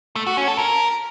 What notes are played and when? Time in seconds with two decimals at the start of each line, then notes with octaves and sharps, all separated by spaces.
0.16 A3
0.27 F#4
0.37 C#4
0.48 A4
0.58 A#4